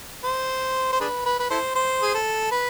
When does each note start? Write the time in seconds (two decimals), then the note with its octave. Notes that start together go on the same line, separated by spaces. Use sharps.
0.24 C5
0.93 C5
1.00 D4 G#4 B4
1.26 B4
1.40 B4
1.51 E4 A4 C5
1.76 C5
2.02 G#4
2.14 A4
2.51 B4